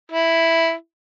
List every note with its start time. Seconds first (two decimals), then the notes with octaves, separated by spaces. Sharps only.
0.12 E4